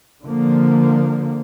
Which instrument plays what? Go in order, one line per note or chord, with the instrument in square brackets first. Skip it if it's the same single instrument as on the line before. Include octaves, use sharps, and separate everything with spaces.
[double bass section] D3 F3 A#3